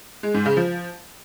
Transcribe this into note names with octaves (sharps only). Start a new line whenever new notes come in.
G#3
G#2
C#3
F3